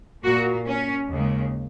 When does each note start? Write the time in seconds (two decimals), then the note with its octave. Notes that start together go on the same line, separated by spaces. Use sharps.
0.24 A#2 A#3 F#4
0.67 C#4
1.10 D#2 C#3 G#3